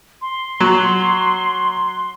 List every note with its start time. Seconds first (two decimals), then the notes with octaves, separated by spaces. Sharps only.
0.22 C6
0.60 F#3